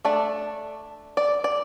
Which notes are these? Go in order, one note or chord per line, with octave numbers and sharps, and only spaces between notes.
A3 D4 D5
D5
D5